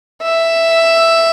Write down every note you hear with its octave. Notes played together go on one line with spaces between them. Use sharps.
E5